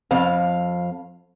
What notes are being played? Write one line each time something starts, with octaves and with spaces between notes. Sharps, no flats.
F2 F5